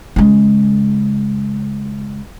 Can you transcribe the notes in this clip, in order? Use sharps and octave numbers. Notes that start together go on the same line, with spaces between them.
C#3 G#3